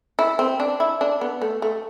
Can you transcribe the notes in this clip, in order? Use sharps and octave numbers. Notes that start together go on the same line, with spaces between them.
E4
C4
D4
E4
D4
B3
A3
A3